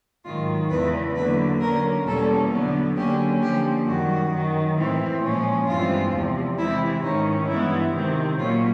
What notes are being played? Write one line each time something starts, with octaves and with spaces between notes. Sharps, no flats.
G#2 D#3 F#3 F4
E2 C#3 E3 G#3 B4
D3 F#3 A#3 B4
D3 F#3 A#3 C#4 A#4
E2 B2 G3 A#3 C#4 A4
D3 F#3 B3
D3 F#3 A#3 C#4 G4
D3 F3 A#3 G4
F#2 D#3 G3 F#4
F#2 D#3 F#3
A2 E3 G#3 C4
A#2 F3 G#3 C#4
G2 E3 G#3 C4 F4
E2 C3 F3
C3 E3 G#3 C4 E4
G#2 D#3 G#3 C#4 D#4
G2 E3 G#3 B3 E4
C3 D#3 G#3 C4
A#2 F#3 A#3 C#4 F4